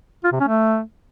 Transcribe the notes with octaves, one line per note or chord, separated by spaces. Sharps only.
F4
C3
C#4
A3